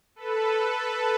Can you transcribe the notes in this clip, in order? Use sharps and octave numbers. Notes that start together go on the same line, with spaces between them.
A4 B4